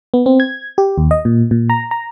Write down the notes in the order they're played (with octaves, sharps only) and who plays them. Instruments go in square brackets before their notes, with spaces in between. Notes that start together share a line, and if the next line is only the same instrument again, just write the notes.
[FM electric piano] B3
C4
G#6
G4
D#2
D#5
A#2
A#2
A#5
A#5